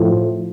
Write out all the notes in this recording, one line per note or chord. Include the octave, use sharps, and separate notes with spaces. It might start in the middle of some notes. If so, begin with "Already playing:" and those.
Already playing: A2 F3